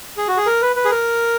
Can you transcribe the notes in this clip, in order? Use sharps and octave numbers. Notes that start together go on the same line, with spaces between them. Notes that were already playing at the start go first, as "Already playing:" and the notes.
G#4
F#4
G#4
A#4
B4
B4
G#4
A#4